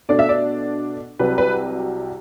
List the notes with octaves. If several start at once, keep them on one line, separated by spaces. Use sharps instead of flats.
B2 A3 D4 D5
E5
D5
C2 C3 F#3 B4
B4